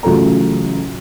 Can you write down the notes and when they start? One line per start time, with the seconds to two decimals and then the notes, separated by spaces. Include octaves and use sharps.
0.03 A1 C#3 F#3 F4 A4 A#5